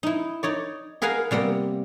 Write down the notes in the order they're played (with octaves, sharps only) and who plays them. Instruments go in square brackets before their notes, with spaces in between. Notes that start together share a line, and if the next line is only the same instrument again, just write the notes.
[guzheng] D#4 E4
D#4 C#5 D5
G#4 A#4 B4 F5 F#5 G#5
C3 G3 A#3 B3